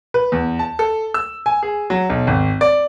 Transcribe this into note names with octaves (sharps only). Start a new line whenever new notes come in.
B4
E2
A5
A4
E6
G#5
G#4
F#3
B1
G#1
D5